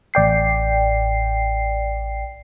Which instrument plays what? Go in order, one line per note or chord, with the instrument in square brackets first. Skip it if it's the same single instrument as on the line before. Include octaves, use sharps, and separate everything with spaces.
[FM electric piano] A1 D5 G5 C7